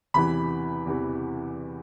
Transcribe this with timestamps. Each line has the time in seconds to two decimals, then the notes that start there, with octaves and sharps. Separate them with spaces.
0.14 E2 C3 E3 B5
0.86 E2 C3 E3